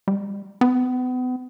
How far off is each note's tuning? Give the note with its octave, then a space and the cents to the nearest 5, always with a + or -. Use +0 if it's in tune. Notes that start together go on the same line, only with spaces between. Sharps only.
G3 +35
B3 +35